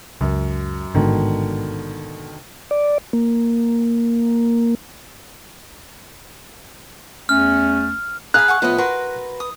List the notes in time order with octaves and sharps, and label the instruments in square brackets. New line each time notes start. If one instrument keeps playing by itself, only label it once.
[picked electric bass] C#2 [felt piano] F#2
[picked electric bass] A1 G#2 [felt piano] B2 D3 D#3
[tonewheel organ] D5
A#3
[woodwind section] E2 A3 C#4 [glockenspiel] F6
[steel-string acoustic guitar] G#4 F5 [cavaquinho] A#5 B5 [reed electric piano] F#6
[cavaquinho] F#5 G#5 C#6
[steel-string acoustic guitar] A2 F3 B3 [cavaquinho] B4 D#5
[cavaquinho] F#4 A#4 C6 [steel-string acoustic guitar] B4
[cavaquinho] D#6